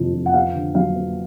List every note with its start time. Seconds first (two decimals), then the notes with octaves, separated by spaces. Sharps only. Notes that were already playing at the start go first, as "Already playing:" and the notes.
Already playing: F2 C3 E3
0.14 F2
0.26 F#5
0.34 B3 F5
0.54 D3
0.75 F#3 F5
0.96 B3